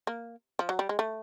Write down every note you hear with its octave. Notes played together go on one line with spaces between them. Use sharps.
A#3
F3
F#3
G3
G#3
A3